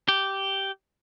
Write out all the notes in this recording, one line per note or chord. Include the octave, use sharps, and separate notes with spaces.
G4